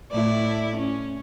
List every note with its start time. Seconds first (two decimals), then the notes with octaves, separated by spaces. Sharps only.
0.12 A2 E4 D5
0.76 C#4